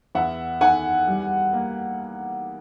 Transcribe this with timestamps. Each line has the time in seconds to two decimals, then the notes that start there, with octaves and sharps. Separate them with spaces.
0.15 E2 E5 F#5
0.61 D#3 F#5 G#5
1.07 G3
1.53 A#3